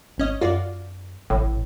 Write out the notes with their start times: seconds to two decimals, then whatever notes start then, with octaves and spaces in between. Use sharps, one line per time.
0.18 G#1 C#4 D#5
0.41 F#2 F4 F#4 D5
1.30 A1 A2